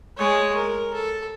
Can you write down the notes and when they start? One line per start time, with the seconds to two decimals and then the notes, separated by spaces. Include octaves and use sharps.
0.18 G#3 C#5
0.56 A#4
0.94 A4